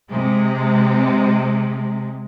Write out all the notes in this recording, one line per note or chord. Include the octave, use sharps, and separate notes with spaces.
C3 G#3